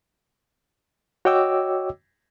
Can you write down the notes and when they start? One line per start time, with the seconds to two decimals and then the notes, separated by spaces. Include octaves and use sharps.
1.25 F#4 C#5 D#5 G5 D6 E6